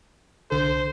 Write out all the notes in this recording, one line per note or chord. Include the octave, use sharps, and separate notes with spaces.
C2 D3 A4 C5